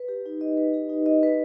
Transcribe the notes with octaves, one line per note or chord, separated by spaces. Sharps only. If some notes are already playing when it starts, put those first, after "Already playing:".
Already playing: B4
G4
D#4
D#5
B4
G4
D#4
D#5
B4